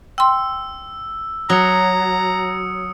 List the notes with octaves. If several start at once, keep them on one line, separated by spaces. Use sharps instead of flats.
G5 C6 E6
F#3 A#5 D#6 C#7